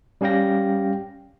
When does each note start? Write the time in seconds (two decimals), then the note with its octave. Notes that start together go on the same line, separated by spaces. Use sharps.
0.21 G3 C#4 G4 F5 G5 A#6